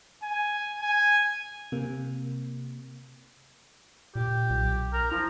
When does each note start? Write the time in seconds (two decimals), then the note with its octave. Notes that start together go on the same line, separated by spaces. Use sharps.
0.23 G#5
0.82 G#5
1.72 C3 A#3
4.15 A#2 G4
4.50 B1
4.93 A#4
5.12 F3 E4